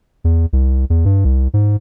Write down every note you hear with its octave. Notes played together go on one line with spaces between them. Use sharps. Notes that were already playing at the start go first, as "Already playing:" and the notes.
E2
C2
E2
G2
C2
G#2